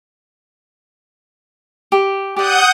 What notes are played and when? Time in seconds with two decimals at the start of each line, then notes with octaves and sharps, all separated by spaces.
1.92 G4
2.36 G4 D5 F#5 D#6 G6